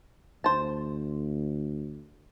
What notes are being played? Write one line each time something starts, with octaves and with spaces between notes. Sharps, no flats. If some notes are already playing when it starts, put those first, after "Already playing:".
D2 C5 A5